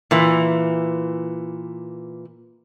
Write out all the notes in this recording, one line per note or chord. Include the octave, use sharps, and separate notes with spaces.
A#2 E3